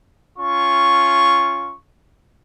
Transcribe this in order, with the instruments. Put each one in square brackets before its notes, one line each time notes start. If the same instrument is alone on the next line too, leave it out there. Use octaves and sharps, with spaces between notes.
[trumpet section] C#4 F4 C#6